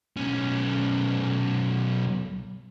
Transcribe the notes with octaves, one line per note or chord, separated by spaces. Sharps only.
B1 C#4